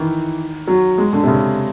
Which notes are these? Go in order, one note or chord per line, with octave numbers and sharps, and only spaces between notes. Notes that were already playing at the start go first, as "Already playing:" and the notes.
Already playing: D#3 E3
F#3
G#3
D3
C3
C#3